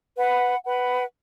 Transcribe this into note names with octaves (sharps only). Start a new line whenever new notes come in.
B4 F#5 B5
B4 F#5 B5